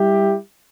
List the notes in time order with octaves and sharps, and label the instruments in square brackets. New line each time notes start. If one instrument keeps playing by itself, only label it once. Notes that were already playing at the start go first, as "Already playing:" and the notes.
Already playing: [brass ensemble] G3 E4 G4